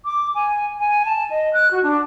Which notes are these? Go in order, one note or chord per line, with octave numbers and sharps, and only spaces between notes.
D6
G#5
G#5
A5
D#5
F#6
F#4
D4